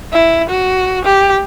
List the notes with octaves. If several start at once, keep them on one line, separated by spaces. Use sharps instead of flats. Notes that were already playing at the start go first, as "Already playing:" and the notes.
E4
F#4
G4